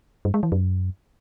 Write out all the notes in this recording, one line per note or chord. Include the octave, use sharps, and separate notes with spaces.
G2
G#3
E3
F#2